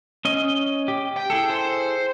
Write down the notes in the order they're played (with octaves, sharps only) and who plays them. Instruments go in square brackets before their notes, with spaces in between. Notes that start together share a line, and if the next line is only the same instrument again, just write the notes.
[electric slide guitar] C#4 D#5
G4
[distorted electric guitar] G5
[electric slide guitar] E4 G#4 A4
[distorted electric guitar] C5